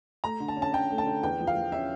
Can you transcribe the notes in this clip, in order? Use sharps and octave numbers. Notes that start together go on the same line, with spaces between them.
A3 A#5
D3
A5
C#4
A5
C#4 G5
A3
A5
D3
E2 G5
F3
F5
F3
C#4 E5